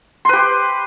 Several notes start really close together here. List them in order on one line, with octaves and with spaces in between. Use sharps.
C6 B4 G4